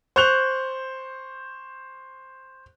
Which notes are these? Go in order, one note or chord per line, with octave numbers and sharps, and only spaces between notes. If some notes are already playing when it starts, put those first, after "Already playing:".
C5 C#6 F#6 G6 F7